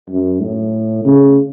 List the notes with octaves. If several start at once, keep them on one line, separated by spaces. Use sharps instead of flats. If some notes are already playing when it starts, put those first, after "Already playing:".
F#2
A2
C#3